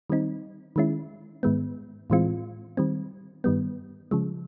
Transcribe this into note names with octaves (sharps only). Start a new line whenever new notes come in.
D#3 G3 C4 D#4
D#3 G#3 C#4 E4
G#2 D#3 G#3 B3
A2 E3 G#3 C4 F4
D#3 G3 C4
G2 D#3 G3 B3
C#3 F3 G#3